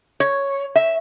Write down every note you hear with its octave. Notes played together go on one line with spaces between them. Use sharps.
C#5
E5